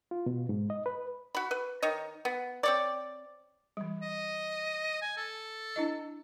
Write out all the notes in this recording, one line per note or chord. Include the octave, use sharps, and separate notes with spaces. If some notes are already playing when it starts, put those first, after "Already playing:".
F4
B2
G#2
D#5
B4
F#4 B5
B4
D#3 C#5 D#5
B3
C4 C#5 D5
E3 G3
D#5
G#5
A4
D4 E4 D#5